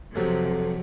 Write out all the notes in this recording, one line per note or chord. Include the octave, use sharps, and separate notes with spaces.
F2 C3 F3 F#3 A4